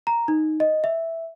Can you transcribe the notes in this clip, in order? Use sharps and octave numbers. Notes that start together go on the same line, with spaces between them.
A#5
D#4
D#5
E5